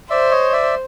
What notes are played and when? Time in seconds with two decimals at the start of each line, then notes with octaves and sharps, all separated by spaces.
0.10 C5 D5 E5
0.31 C#5 D#5
0.53 D5 E5